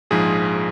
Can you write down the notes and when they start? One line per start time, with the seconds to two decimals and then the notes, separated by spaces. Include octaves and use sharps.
0.11 A#1 G#2 F3 G#4